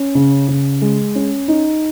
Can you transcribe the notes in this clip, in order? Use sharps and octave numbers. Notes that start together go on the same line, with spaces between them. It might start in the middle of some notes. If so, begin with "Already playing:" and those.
Already playing: C#4
C#3
C#3
G#3
C#4
D#4